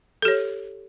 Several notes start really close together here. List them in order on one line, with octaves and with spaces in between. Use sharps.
A4 G4 C#5